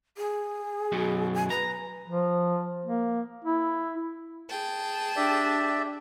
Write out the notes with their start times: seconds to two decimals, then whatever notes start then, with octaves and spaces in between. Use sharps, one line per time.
0.18 G#4
0.92 F#2 B2 F#3
1.34 G#5
1.50 B4 A#5
2.08 F3
2.86 A#3
3.45 E4
4.48 G#4 G5 A5
5.16 D4 G4 D5 E5